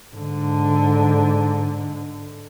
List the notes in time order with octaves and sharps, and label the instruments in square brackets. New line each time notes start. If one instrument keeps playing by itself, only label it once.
[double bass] G#2 D3